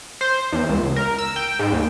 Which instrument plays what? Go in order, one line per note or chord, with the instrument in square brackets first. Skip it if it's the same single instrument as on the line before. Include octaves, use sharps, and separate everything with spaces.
[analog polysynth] C5
E2
C#2
A#4
E6
G5
G#2
D#2